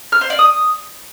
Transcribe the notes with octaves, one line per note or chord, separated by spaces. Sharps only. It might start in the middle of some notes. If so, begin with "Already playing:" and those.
F6
C5
D5
D#6